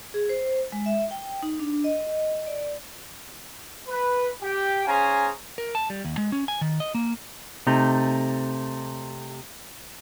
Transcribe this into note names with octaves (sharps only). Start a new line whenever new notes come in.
G#4
C5
G#3
E5
G5
D#4
D4
D#5
D5
B4
G4 G5
C#4 G#4 C5 F5 G#5 A#5
A#4
A5
G3
D#2
G#3
C#4
G#5
D#3
D#5
A#3
C3 A3 D#4